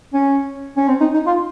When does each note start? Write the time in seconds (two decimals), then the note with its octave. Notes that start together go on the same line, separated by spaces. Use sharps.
0.14 C#4
0.77 C#4
0.88 C4
1.00 D#4
1.14 D#4
1.26 F4